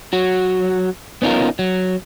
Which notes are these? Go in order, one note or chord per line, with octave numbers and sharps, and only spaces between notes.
F#3 F#4
B3 C#4 D#4 F4 A#4
F#3